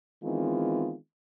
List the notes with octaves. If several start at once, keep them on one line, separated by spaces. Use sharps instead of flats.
D#3 E3 G#3 B3 C4 F4